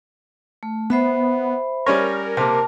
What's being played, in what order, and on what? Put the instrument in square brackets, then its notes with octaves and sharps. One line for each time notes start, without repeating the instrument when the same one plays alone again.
[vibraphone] A3
[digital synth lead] B3 [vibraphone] C5 E5 B5
[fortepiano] G3 C#4 C#5 [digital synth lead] A#4
[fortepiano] C3 A#3 [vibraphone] A5